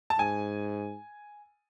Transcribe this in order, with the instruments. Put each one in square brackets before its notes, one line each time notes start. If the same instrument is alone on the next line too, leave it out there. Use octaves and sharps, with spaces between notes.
[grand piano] A5
[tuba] G#2 [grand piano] G#5